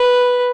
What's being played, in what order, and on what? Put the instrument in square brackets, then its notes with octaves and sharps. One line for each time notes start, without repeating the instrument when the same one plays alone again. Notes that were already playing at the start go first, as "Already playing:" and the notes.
Already playing: [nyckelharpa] B4